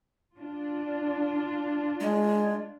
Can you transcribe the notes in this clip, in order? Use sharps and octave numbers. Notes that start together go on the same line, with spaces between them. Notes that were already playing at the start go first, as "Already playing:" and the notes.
D4 F4
G#3